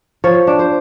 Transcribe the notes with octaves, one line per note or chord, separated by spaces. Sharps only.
F3 C#5
D4
C5